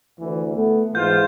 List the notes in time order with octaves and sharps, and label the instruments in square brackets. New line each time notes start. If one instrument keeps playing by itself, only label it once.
[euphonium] D2 [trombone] E3
[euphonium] A3 [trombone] B3
[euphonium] G#2 [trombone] E3 [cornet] F4 [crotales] G6